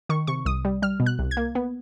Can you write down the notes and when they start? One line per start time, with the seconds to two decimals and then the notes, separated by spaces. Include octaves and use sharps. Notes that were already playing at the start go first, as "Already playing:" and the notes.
0.09 D#3 C#6
0.27 C3 C#6
0.46 C2 D#6
0.65 G3
0.82 G3 F6
1.00 B2
1.06 F#6
1.19 C2
1.31 G#6
1.37 A#3
1.55 B3